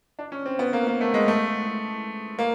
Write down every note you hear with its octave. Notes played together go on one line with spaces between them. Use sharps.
D4
C#4
C4
B3
A#3
A#3
A3
G#3
A3
A#3